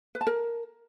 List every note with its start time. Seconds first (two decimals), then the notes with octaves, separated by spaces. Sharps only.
0.15 B4
0.21 A5
0.27 A#4